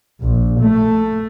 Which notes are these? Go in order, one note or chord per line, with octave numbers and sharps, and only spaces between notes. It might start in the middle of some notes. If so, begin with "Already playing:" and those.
A#1
A3